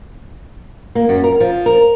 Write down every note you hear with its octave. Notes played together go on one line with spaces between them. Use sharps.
A#3
F#2
A#4
F3
A#4